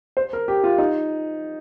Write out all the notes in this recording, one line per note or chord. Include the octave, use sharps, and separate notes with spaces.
C5
A#4
G4
F4
D#4